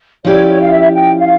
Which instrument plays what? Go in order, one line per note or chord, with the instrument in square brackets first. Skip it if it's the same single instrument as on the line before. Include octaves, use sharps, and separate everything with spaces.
[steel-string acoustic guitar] F3 C#4 E4 G4 D5 [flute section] C#5
[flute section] C#5
F5
E5
G5
F5